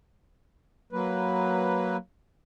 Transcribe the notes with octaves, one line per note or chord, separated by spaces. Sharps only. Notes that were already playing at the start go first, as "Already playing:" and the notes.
F#3 A#3 B4